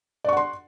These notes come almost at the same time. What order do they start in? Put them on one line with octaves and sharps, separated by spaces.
D5 C#6 F#5 C6